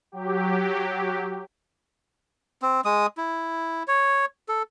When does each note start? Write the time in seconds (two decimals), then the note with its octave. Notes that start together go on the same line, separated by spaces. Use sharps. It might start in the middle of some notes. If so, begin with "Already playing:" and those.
0.12 F#3 G4
2.62 C4
2.85 G#3 D#6
3.18 E4
3.88 C#5
4.49 A4